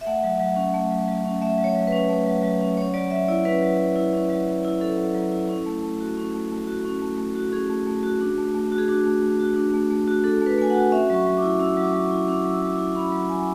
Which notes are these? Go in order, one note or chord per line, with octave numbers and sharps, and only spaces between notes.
E5
A3 F#5
F#3
F#3
C#4
A3
F#3
F#3
C#4
A3 E5
F#3
C#5
F#3
B4
C#4
A3
F#3
F#3
C#4
C#4 C#5
F#3 D5
F#3 E5
E4 D5
C#4 B4
F#3
F#3
E4
C#4
F#3
F#3
E4
C#4 A4
F#3
F#3
E4
C#4
A3
A3
F#4
C#4
A3
A3
F#4
C#4
A3
A3
F#4
C#4 G#4
A3
A3
F#4
D4
A3
A3
F#4
G#4
D4 F#4
A3
A3
F#4
D4
A3
A3
F#4
D4 A4
A3
B4
A3 G#5
F#4 F#5
C#4 E5
F#3 C#6
F#3
D6
E4
C#4 E6
F#3
D6
F#3
E4
C#4 D6
F#3
E6
F#3
E4 D6
C#4 B5
F#3
F#3 G#5